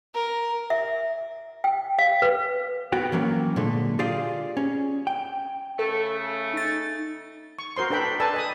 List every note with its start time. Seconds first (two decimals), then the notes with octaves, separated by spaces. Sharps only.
0.14 A#4
0.70 E5
1.64 G5
1.99 F5
2.22 B4
2.92 B3 F#4 G5
3.12 E3 F#3 A#3 C#4
3.56 A#2 D3 G#3 A3
3.99 F4 G4 G#4 D5 F5
4.57 C#4
5.07 G5
5.79 C#3 A3 A4
6.54 D#4 A6
7.59 C#6
7.76 F#4 A#4 C5 C6
7.90 D4 A4 B4 G5 B5
8.20 A4 B4 D5 G#5 A5 E6
8.34 D#5 G#5 D#6